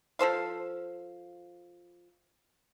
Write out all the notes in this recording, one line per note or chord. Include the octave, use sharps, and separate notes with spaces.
F3 A4 C5 F5